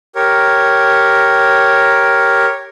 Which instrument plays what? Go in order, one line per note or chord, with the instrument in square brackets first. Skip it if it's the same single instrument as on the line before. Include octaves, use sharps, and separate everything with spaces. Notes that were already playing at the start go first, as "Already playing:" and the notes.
[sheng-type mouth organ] G4 A#4 C#5